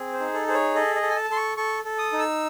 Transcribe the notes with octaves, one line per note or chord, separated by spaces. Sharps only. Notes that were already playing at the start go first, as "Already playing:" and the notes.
Already playing: C4 G#4
C5
D#4
A4
G#4 C5
C#5
A4 D#5
D#5
A4
G#5
A5
A4 C6
C#6
A4 C#6
A4
D#6
D#4
E6